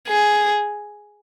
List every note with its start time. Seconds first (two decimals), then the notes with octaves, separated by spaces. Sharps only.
0.08 G#4